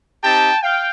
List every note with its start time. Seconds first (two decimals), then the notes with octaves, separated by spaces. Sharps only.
0.22 C4 D#4 G4 G5 A5
0.62 F5 G5